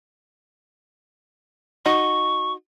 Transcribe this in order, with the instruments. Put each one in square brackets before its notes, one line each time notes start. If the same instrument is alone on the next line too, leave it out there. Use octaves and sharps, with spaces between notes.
[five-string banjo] D#4 F#4 D#5 [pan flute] C#6